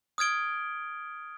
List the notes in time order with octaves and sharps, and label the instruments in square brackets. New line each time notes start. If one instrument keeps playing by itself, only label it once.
[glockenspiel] D#6 F6 G#6 D7 G7